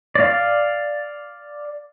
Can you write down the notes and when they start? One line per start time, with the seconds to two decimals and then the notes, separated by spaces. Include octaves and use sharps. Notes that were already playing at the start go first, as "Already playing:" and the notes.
0.15 D5 F5